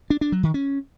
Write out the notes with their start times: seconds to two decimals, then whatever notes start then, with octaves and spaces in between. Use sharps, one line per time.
0.10 D4
0.21 D4
0.32 F#3
0.43 D#3
0.54 C#4